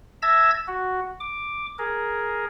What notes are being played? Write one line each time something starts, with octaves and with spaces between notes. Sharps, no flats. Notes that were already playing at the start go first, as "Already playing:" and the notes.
E5 A5 E6 G#6 A#6
F#4
D6
G#4 A#4